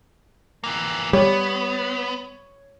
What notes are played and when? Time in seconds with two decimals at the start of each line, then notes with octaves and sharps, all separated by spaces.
0.64 E3 A#3
1.13 G3 B3 C#5